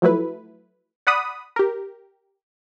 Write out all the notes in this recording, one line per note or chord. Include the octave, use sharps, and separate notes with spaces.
F3 F#3 A3 E4 B4
D5 F#5 B5 D#6
G4 A#4